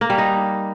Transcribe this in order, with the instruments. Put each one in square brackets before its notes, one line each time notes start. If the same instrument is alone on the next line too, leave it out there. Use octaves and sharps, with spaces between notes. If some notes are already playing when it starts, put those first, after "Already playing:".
[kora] A#3
G3
D#4